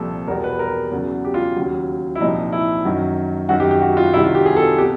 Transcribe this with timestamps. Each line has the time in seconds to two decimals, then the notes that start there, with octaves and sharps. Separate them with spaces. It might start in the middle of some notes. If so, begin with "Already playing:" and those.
Already playing: C2 A#2 F3 A4
0.28 E2 B2 G3 A#4
0.44 B4
0.59 A#4
0.92 E2 C#3 F#3
1.25 G4
1.34 F4
1.56 D#2 C#3 F#3
2.16 E4
2.20 C2 A#2 F3 D#4
2.52 E4
2.85 F#2 D#3 F#3
3.49 F#2 D#3 F#3 F#4
3.60 G4
3.71 G4
3.81 F#4
3.97 F4
4.14 C2 C3 D#3 F#3 E4
4.24 F4
4.35 G4
4.46 G#4
4.57 A4
4.78 B2 G4